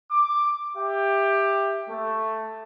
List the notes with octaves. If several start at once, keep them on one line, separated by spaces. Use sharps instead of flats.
D6
G4 E5 G5
A3